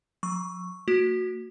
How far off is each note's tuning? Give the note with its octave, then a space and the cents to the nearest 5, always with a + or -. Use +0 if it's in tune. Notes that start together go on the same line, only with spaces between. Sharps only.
F#3 -45 C#6 +0
A#3 -45 F#4 -10